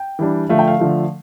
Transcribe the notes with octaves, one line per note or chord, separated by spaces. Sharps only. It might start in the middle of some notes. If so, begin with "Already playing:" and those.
Already playing: G5
E3 G3 D4
D3 F3 A3 F5
G5
F5
D3 F3 A3